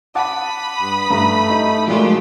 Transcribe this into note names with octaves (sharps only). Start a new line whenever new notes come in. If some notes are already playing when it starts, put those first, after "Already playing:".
F#5 A5 B5 D6 D#6
G2
G2 A3 A#5
D#4
A#2 F#3 G#3 A3 F4 G4